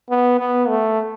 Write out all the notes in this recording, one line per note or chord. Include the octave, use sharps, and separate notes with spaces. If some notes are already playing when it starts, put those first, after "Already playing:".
B3
B3
A3